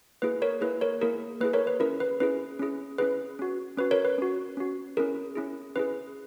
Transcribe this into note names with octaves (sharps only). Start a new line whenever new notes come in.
A#3 E4 G#4 B4
A#4 C#5
A#3 E4 G#4 B4
A#4 C#5
A#3 E4 G#4 A#4
A#3 E4 G#4 B4
A#4 C#5
B4
C#4 E4 G#4 A#4
B4
C#4 E4 G#4 B4
C#4 E4 G#4
C#4 E4 G#4 B4
C#4 F#4
C#4 F#4 B4
A#4 C#5
B4
C#4 F#4
C#4 F#4
C#4 E4 G#4 A#4
C#4 E4 G#4
C#4 E4 G#4 B4